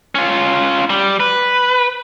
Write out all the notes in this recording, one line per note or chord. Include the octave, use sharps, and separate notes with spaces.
C#4 F4
G3
B4